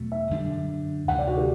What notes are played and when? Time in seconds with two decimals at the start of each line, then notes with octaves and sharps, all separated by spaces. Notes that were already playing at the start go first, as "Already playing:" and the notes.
Already playing: E2 B2 F#3 A3
0.12 E5
0.31 F#2 D3 G3 D4
1.08 D2 C3 E3 F#5
1.18 D5
1.27 F#4
1.37 G4